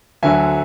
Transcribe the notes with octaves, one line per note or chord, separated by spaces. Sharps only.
D2 D3 F#3 E5 G#5